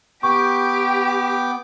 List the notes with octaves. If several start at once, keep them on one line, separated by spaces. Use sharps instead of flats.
B3 G4 G5 C#6 D6